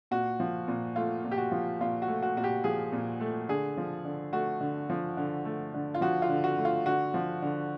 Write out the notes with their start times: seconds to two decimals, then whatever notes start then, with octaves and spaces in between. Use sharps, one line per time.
0.11 A#2 F#4
0.40 F3
0.68 A#2
0.96 A3 F4
1.24 A#2
1.31 G4
1.38 F#4
1.52 F3
1.80 A#2 F4
2.02 F#4
2.08 A3
2.23 F#4
2.36 A#2 F#4
2.44 G4
2.64 F3 G#4
2.92 A#2
3.20 A3
3.49 D3 G#4
3.77 F3
4.05 D3
4.32 A3 F#4
4.61 D3
4.90 F3
5.17 D3
5.45 A3
5.74 D3
5.94 F4
6.01 F3 F#4
6.22 F4
6.29 D3
6.44 F#4
6.58 A3
6.65 F4
6.86 D3 F#4
7.14 F3
7.42 D3